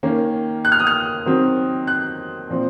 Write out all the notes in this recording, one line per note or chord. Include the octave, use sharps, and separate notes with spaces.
D#3 A#3 C#4
F#6
F6
D#6
F6
D#3 F#3 C4
F#6
A#2 F3 C4